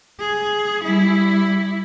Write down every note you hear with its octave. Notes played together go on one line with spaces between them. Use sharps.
G#4
G3 E4